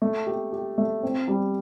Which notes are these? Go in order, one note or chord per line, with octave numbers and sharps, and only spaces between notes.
A3
G4
G4
A3
C4
G3